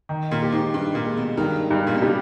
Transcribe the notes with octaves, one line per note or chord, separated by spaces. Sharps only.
D#3
A#2
G4
G#2
G2 D#4
A#2
G#3
B2
G2 D#3
G2
A#2
B2
C#3 G3